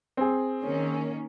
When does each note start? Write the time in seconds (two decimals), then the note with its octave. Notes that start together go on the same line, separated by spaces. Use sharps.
0.17 C4 G#4
0.62 D#3 A#3 C#4